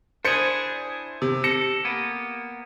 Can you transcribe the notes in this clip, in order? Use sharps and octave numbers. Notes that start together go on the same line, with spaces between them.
D4 E4 G#4 C5 C#7
C3
A4 A#6 C#7
A#3 B3